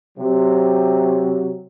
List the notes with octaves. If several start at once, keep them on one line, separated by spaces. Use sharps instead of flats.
C3 F#3